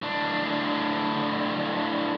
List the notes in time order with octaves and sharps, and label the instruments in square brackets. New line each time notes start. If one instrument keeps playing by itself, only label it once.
[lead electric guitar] A2 D4